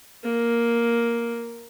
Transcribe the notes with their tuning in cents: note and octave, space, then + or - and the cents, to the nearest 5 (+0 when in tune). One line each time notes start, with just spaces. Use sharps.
A#3 +5